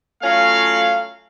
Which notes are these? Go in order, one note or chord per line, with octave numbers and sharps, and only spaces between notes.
F#3 A3 C#4 F4 F5